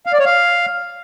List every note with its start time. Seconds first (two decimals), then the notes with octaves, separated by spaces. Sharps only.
0.06 F5
0.13 D5
0.19 C#5
0.26 F5